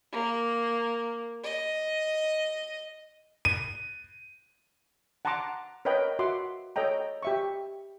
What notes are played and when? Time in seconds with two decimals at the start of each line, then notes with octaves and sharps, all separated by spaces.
0.12 A#3
1.44 D#5
3.45 D#7
5.25 F#5 A5 A#5 C6 D6
5.85 A#4 B4 C#5 D#5 G5
6.19 F#4 E5 F#5 C6 D6
6.76 A4 C#5 D#5 G5 A#5
7.23 G4 E5 C#6